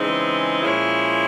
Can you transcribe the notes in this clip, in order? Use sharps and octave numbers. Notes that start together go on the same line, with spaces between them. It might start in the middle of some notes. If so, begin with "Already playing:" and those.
Already playing: C#3 E3 G#3 C4 D#4
A#2 F3 G#3 C#4 E4